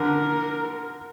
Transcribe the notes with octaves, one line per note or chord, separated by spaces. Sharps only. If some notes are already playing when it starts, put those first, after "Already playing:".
Already playing: D3 A#4